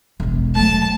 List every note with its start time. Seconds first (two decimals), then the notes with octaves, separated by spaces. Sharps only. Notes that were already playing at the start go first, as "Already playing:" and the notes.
0.20 E1 A#1
0.55 F#3 A3 A5